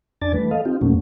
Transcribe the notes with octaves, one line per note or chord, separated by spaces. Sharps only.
E2 D4 D5 G#5 A5 A6
E3 G3 A3 B4
A4 D#5 F5
C4 D#4 F4 G4
E2 B2 F#3 A3 A#3 C#4